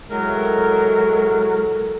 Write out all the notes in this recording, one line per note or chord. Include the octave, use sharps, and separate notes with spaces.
A2 F#3 G#3 A#4